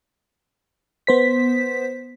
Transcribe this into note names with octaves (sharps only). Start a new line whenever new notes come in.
B3 C5 B6